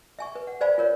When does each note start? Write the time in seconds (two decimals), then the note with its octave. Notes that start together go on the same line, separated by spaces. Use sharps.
0.19 E5 G#5 C#6
0.35 B4
0.47 F#5
0.61 B4 C5 D5 F5 G#5 B5
0.78 F4 A#4 C#5